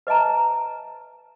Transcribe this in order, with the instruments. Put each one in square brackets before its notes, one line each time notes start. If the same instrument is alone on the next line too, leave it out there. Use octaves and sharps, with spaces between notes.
[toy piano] B4 D#5 E5 A5 A#5